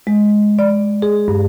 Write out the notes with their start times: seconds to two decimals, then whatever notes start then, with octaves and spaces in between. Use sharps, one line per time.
0.07 G#3
0.59 D5
1.02 G#4
1.28 G2